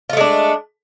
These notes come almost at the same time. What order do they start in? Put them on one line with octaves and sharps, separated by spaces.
F4 A3 G#3 D4